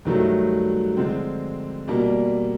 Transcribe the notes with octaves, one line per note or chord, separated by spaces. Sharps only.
G2 D#3 F#3 A3
D3 F3 G#3 C4
B2 G3 A#3 D4